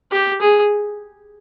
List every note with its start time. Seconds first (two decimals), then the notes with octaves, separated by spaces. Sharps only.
0.12 G4
0.41 G#4